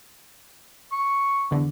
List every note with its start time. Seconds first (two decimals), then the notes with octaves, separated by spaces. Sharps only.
0.92 C#6
1.51 E2 D3